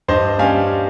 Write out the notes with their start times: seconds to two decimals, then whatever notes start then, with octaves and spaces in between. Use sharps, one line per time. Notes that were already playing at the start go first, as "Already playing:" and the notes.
0.08 G2 C5 D#5
0.39 G3 C#4 F5 G#5